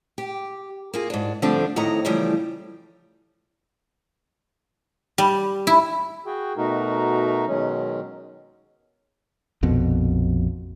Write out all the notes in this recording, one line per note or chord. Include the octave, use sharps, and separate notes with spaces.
G4
A#3 F4 G#4
G#2 D4
D3 F3 G3 A3 C4 D4
F2 A2 D#3 A3 D#5 A#5
C#3 E3 F3 G3 A3
G3
E4
F#4 G#4 G5
B2 A3 D#4 F#4 A#4
B2 D#3 F#3 G#3 C#4
A#1 F2 B2